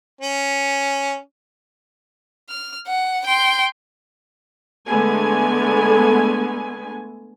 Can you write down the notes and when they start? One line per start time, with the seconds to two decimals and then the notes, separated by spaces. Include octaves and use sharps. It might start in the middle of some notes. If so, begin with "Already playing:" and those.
0.21 C#4
2.49 F6
2.87 F#5
3.26 G5 C6
4.86 D3 G#3 A3 B3 G#5